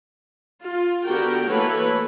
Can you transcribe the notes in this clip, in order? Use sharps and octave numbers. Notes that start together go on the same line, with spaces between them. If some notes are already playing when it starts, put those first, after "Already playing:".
F4
D3 B3 F#4 G4 A#4 G5
E3 A3 A#3 A4 B4 C#5